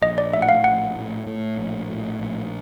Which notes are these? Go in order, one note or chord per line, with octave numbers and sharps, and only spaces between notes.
A#1 D#5
D5
A2 E5
F#5
F5
A#1 F#5
A2
A2
A#1
A2
A#1